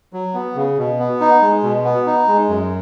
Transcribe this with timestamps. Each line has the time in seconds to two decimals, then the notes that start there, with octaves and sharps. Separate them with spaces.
0.13 F#3
0.34 B3
0.55 C#3
0.78 B2
0.99 B3
1.21 D#4
1.42 G#3
1.63 B2
1.85 B3
2.06 D#4
2.28 G#3
2.49 F#2